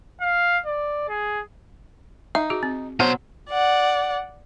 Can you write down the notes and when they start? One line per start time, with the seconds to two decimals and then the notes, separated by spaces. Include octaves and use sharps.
0.21 F5
0.66 D5
1.09 G#4
2.35 D#4 E5
2.50 F#4 G#4
2.63 C4
3.00 B2 F#3 B3 C5
3.50 D5 F#5